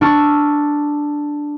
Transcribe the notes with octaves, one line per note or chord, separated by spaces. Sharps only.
D4 C#6 E6 F6